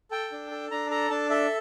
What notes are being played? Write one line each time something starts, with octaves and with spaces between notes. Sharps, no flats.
A4 G5
D4
A4
D4 A#5
A4 A#5
D4 A5
A4 E5